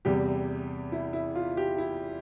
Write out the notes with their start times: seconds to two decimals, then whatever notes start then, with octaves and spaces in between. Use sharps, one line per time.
0.05 E2 C3 G3 G4
0.92 E4
1.13 E4
1.35 F4
1.57 G4
1.78 E4